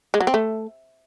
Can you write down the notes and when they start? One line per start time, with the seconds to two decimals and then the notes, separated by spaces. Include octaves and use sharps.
0.14 G#3
0.20 F#3
0.27 C4
0.34 A3